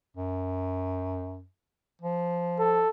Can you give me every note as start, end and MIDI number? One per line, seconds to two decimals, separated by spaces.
0.17 1.45 42
2.02 2.82 53
2.59 2.89 69